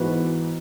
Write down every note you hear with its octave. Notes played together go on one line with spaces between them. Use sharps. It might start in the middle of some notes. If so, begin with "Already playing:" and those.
Already playing: G#2 E3 B3 F#4 B4